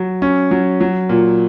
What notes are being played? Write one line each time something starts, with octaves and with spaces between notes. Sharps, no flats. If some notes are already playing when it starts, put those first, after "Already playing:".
Already playing: F#3
C#4
F#3
F#3
A#2